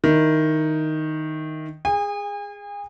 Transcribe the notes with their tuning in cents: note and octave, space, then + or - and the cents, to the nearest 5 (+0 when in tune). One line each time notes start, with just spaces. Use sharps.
D#3 +0 E4 +0
G#4 -15 G#5 -40